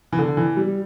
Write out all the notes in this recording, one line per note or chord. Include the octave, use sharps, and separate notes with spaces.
E3
D3
E3
G3